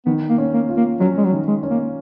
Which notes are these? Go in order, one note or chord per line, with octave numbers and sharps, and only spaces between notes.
D#3 B3
A#3
C#4
A#3
F4
A#3
F#3 C#4
G#3
F#3
D#3
G#3
C#4
A#3